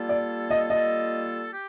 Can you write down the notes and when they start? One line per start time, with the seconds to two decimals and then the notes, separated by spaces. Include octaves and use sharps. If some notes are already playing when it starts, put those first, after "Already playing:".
Already playing: G3 A#3 F4 A4
0.09 D5
0.50 D#5
0.70 G3 A#3 F4 A4 D#5
1.53 G4